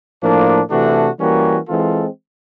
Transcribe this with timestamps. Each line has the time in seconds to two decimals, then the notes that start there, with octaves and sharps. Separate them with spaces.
0.22 A2 F3 A#3 D4
0.70 C3 E3 A3 D4 F#4
1.19 E3 G3 A#3 C#4 F#4
1.67 E3 G#3 C4 F4 A4